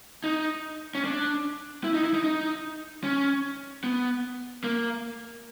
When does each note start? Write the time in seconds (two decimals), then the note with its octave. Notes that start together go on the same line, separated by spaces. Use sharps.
0.24 D#4
0.95 C#4
1.04 D4
1.84 E4
1.94 D#4
2.04 E4
2.14 D#4
2.24 D#4
3.04 C#4
3.84 B3
4.64 A#3